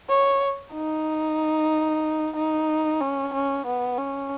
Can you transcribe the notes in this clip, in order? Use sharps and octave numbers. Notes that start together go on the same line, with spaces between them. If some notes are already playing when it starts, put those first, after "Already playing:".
C#5
D#4
D#4
C#4
C#4
B3
C#4